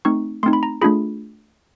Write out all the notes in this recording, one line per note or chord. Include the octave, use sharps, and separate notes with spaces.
A3 C4 D#4 C#6
A3 C4 D#4 C6
B5
A#5
A3 D4 F4 G#4 B5